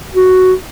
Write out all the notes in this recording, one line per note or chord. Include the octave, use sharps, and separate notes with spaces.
F#4